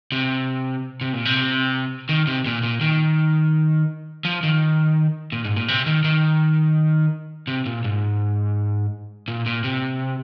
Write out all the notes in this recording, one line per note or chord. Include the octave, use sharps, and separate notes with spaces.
C3
C3
A#2
C3
D#3
C3
A#2
A#2
D#3
F3
D#3
A#2
G#2
A#2
C3
D#3
D#3
C3
A#2
G#2
A#2
A#2
C3